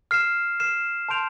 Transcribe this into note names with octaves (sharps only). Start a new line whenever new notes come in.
F6 C7 E7
F6 C7 E7
A5 C6 G6 D7 F7